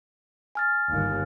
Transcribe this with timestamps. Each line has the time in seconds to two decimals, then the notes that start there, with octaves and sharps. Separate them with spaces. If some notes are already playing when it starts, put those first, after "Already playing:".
0.55 G#5 F6 A6
0.91 G1 D#2